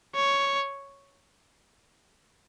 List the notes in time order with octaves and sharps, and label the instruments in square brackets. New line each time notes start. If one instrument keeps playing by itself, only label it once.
[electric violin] C#5